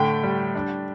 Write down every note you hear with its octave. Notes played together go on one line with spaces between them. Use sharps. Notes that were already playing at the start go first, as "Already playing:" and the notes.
Already playing: A2 D3 A3 G5
G3
D4